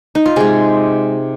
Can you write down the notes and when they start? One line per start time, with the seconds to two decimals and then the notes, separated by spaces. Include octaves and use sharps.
0.15 D#4
0.26 F4
0.36 C3 G#3 G#4